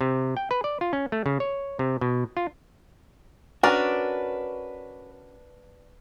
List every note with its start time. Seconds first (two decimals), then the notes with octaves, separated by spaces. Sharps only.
0.01 C3
0.37 G5
0.51 B4
0.64 D5
0.81 F4
0.93 C#4
1.12 A3
1.26 C#3
1.40 C#5
1.79 C3
2.01 B2
2.37 F4
3.63 C#4 D4 F#4 A#4 B4 D5